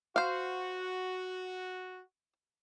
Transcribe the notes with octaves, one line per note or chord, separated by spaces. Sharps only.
F#4 C5 F5